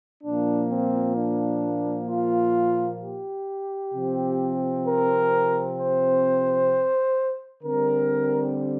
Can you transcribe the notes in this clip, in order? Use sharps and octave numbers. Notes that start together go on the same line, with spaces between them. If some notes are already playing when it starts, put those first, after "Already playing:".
A#2 F3 A#3 D4
C4
D4
F4
G4
C3 F3 C4
A#4
C5
D3 G3 C4 A#4